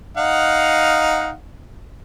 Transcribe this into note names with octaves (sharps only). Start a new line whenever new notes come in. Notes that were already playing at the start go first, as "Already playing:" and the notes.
D#4 F5 F#5